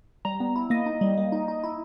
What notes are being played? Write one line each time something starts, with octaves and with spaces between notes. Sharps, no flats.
G3 A#5
B3
E4
A#3 D#5
D#4
G3
A#3
D#4
D#4
E4